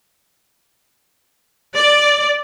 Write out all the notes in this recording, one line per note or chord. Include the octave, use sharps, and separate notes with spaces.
D5